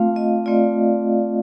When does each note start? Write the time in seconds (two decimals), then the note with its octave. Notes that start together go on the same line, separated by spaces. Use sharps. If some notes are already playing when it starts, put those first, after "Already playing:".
Already playing: A3 C4 F4 F5
0.16 D#5
0.46 A3 C4 F4 D5